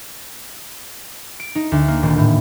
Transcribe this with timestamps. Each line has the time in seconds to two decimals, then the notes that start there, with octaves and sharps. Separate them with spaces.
1.40 D7
1.55 D#4
1.72 D2
1.88 A#3
2.03 D#1
2.18 A2